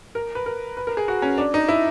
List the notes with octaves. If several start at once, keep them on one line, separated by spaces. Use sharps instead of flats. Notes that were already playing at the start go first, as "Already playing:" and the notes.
A#4
B4
A#4
B4
A#4
G#4
F#4
C#4
D4
D#4
E4